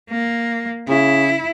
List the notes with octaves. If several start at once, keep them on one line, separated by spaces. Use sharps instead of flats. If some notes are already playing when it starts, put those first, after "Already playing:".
A#3
C#3 E4